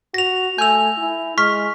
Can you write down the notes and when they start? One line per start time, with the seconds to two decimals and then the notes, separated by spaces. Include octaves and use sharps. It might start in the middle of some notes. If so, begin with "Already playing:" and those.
0.14 F#4 A#6 F7
0.58 A3 G#5 E6 G6 F7
0.98 E4
1.38 G#3 C#6 F6 B6